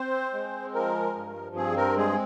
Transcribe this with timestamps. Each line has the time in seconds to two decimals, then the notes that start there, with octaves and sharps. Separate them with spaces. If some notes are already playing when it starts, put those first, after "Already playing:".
Already playing: C4 C5
0.33 G#3
0.74 F3 A#4
1.15 G2
1.56 C4 G#4
1.77 A#4
1.97 G#3 G#4